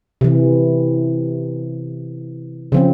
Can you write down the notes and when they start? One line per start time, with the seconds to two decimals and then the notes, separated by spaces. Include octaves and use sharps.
0.21 C3 E3
2.72 C#3 F3 C4